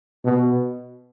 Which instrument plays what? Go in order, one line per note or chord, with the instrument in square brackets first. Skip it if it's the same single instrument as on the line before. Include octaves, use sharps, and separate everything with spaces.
[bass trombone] B2